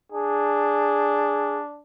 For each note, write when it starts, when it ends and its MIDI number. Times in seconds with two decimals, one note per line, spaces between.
0.12 1.82 62
0.12 1.61 68